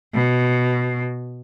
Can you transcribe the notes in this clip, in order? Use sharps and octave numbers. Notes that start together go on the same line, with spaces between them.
B2